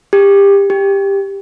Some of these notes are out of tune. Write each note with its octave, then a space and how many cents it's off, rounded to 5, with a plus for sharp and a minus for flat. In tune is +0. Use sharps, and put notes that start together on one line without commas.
G4 +25
G4 +10